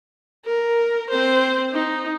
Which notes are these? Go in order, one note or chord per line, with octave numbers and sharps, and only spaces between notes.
A#4
C4 C5
D#4